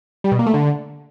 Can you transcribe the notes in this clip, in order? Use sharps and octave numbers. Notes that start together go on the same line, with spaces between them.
G3
B2
A#3
A3
D3